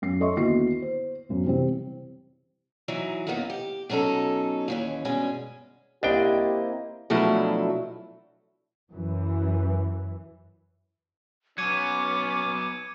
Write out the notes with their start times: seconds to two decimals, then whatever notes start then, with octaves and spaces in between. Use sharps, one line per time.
0.02 F#2 C7
0.20 A4 C#5 D#5 E5 C6 C#6
0.36 D#2 D3 B3 E4 F#4 C7
0.82 C5
1.29 F#2 B2
1.45 C3 E3 G3 C4
2.88 E3 F#3 D#4
3.27 F#2 D#3 A#3 B3 D#4
3.50 G4
3.89 B2 F#3 C#4 D#4 A4
4.68 D#2 E3 C#4
5.05 G2 B2 G#3 C#4 G#5
6.03 C2 A#3 C4 D4 E4 G4 D#5 G5
7.10 B2 F3 F#3 A3 D4 E4
8.92 F#2 E3
11.58 F#3 B3 C#4 D6 G#6 C#7 D#7